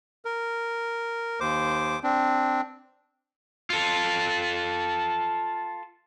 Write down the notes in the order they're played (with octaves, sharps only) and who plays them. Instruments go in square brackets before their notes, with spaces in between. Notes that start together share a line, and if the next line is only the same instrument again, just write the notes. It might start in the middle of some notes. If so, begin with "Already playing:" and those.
[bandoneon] A#4
D#2 C5 D6
C4 D4
[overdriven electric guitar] F4 A4